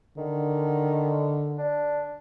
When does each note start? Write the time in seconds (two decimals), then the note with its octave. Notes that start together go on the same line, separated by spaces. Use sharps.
0.18 D3 D#3
1.58 D4